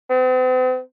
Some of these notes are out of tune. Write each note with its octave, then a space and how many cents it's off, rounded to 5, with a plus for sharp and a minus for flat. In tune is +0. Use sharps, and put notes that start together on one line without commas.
C4 -45